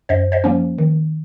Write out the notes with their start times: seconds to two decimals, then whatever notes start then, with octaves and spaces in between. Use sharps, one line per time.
0.09 F#2 C5 D#5
0.32 C5 D#5
0.44 F3 A#3 C#4
0.78 D#3